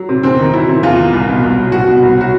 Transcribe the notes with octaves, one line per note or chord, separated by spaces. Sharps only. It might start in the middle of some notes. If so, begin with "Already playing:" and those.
Already playing: F#3
C3
E2 C4
D#3
F#3 E4
C3
E2 F4
D#3
C2
B2
C2
F#3
C2 F#4
B2
C2
F#3 F#4